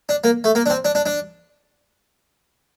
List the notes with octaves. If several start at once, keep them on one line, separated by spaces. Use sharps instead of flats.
D4
A#3
A3
A#3
D4
C4
D4
D4
D4